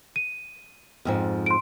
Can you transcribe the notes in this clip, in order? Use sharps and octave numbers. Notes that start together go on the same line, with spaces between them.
D#7
F2 G#2 F3
C6 D7